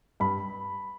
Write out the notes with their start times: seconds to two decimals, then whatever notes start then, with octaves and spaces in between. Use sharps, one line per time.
0.20 G2 B5